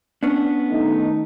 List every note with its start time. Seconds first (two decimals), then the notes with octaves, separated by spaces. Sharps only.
0.23 B3 C#4 D4
0.70 D#3 A3 D#4